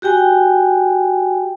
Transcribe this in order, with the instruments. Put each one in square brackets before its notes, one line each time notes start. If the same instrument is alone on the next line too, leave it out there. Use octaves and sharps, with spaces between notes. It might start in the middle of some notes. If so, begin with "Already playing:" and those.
[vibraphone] F#4 G4 G5 G#5